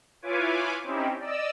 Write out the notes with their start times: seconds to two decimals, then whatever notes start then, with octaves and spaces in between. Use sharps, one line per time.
0.22 E4 F4 B4 C#5 G#5 D6
0.84 C4 C#4 D#4 E4 G4
1.19 D5 D#5 E6